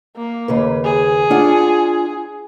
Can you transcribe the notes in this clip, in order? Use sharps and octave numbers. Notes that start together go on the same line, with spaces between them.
A#3
D#2 C#3 B4
G#4
D4 F4 F#5